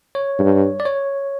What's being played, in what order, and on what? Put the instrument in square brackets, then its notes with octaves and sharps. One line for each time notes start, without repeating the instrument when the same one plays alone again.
[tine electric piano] C#5
[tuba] G2
[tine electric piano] D5
C#5